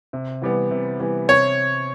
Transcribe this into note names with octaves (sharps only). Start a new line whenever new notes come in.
C3
E3 G3 B3
C3
E3 G3 B3
C3 C#5